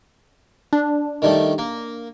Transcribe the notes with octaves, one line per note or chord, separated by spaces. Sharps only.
D4
D#3 G3 A3
A#3